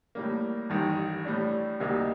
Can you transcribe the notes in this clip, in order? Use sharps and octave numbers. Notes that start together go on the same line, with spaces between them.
A2 G3 A#3
A1 G2 D#3
A2 G3 D4
D2 C3 G3 A#3 D#4